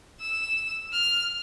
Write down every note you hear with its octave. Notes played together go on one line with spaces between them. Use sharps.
E6
F6